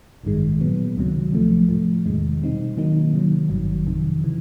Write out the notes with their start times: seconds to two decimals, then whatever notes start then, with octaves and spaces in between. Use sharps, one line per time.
0.24 A1 G2 D#3 G#3
0.60 A#2 F#3 B3
0.97 C#2 C3 D#3 F#3
1.32 C3 F3 A3
1.68 A2 F3 A3
2.05 E2 C3 D#3 G#3
2.41 B2 G3 C4 D#4
2.77 D#3 F#3 A#3 D#4
3.13 C3 D#3 F#3
3.49 G#1 G2 D#3 F#3
3.86 F2 C3 D#3
4.22 C#3 E3